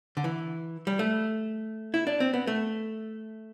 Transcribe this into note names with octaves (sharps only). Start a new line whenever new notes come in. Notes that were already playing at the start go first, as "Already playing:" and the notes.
D3
E3
G3
A3
E4
D4
C4
B3
A3